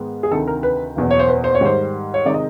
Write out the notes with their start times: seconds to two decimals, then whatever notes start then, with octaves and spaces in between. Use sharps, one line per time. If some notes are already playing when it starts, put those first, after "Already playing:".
Already playing: G#2 D#3 G#3 B3
0.23 G#4
0.31 D2 C3 D#3 A4
0.48 A#4
0.63 B4
0.96 F#1 E2 B2
1.11 C#5
1.19 C5
1.28 B4
1.44 C5
1.55 C#5
1.61 G#2 D#3 G3 C5
2.14 C#5
2.25 C3 D#3 G#3 D5
2.34 D#5